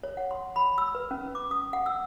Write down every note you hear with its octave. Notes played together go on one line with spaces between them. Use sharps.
C#5
F#5
C6
B5
E6
B4
C#4
D6
D#6
F#5
E6